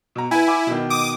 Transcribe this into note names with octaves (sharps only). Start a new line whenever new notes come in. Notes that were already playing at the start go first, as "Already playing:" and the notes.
B2 A#5
E4 B4 G#5
G#5 D6
B2 D#3
D6 D#6